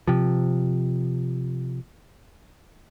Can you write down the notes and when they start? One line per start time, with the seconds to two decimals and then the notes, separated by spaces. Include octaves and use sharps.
0.07 C3 F3